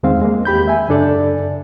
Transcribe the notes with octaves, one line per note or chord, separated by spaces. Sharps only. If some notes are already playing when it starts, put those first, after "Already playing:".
E2 D#3 G#3 C4 F5
G#3 A#3
E2 G4 B5 G6
E5 G#5
F#2 C#3 D4 A4 D5